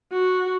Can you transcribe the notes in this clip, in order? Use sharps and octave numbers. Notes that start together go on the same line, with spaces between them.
F#4